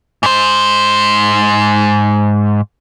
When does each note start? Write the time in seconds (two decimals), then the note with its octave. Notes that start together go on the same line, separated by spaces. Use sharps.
0.23 G#2 C5